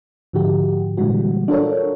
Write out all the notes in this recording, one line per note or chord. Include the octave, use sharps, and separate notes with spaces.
G#2 D3 F3 F#4 G4
A#2 D3 E3 G3 G#3 F#4
D4 F4 F#4 A4 A#4 C#5